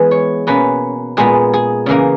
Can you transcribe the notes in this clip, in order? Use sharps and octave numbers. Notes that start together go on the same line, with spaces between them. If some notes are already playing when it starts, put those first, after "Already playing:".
Already playing: E3 G#3 B3 B4
C#5
B2 A#3 C#4 B4
A#2 G#3 B3 G#4
G#4
C#3 E3 A#3 C#4